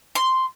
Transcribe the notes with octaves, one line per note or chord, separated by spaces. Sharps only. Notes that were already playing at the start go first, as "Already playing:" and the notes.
C6